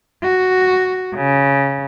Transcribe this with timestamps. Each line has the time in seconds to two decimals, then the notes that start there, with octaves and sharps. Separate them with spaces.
0.24 F#4
1.15 C#3